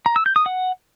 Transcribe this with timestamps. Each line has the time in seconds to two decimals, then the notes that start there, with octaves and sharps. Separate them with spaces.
0.06 A#5
0.16 E6
0.26 G6
0.36 D#6
0.46 F#5